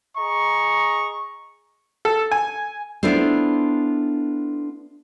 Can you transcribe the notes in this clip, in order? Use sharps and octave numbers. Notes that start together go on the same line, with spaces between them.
G#4 D#5 A#5 C#6
A4
G#5
B3 D4 E4 F4 A4 C5